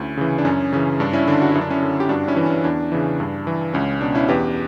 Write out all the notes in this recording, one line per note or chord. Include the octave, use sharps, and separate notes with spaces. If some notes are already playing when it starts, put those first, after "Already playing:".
Already playing: D2 C#4 E4
C#3 E3
D4
F#2 C#4
C#3 E3 C#4
G2 D4
C#4 E4
D3 D4
F#4
F#2 E4
D4
C#4 E4
D3
G4
G2 D4 F#4
C#4 E4
E3
C#4
E2 D4
C#3 E3
G2
E3
C#2 C#4
B2 D4
C#4 E4
E2 G4 B4